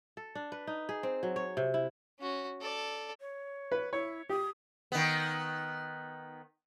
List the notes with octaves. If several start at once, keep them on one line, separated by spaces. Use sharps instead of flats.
A4
D4
B4
D#4
G#4
C4
F#3
C#5
C3
E4
C#4 F#4
A4 D5
C#5
B4
E4 C#5
G4 D#6
D#3 B3